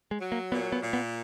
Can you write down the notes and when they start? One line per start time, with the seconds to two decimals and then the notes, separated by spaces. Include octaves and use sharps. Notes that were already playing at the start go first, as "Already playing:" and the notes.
0.11 G#3
0.21 F#3
0.32 A#3
0.52 A#2 B3
0.72 B3
0.82 A#2
0.93 B3